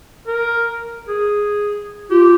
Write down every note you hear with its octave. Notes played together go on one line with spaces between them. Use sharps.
A#4
G#4
F4 G4